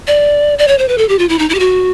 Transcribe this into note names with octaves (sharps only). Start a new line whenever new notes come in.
D5
D5
C#5
C5
B4
A4
G4
F4
E4
D#4
E4
G4
F#4